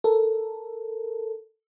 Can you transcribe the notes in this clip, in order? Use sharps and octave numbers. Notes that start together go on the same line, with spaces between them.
A4 A#4